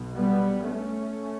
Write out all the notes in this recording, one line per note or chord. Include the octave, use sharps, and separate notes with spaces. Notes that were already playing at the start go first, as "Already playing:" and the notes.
Already playing: B1 B2
G3 B3
A3 C#4